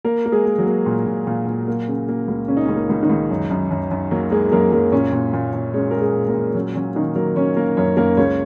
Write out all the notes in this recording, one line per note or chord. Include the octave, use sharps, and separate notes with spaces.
A#3 A#4
A#3
G#3 G#4
A#3
F#3 F#4
A#3
A#2
A#2
A#2
A#2
A#3
C#3
A#3
C#2
C#3 C#4
D#4
C#4
C#2
A#3
C#2
D#3 D#4
C#2
F#2
F#2
F#2
F#2
F#3 A#3 F#4
G#3 A#3 G#4
F#2 A#3 A#4
F#2 A#3 A#4
A#2 C#4 C#5
A#2
A#2
A#2
G#3 C#4 C#5
G#3 A#4
G#3 G#4
A#2
A#3 A#4
A#2
F#3 C#4
F#3 C#4
D#3 A#3 D#4
F#3 A#3 A#4
F#3 C#4 C#5
A#3 A#4
F#2 C#4 C#5
F#2 A#3 A#4
C#2 C#4 C#5